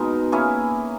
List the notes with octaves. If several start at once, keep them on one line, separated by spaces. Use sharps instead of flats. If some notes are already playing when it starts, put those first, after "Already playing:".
Already playing: B2 G#3 D#4 A#4
A#3 C#4 E4 G#4